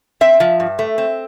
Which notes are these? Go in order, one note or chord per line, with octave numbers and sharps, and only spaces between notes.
C4 E5
F3
G2
A3
C4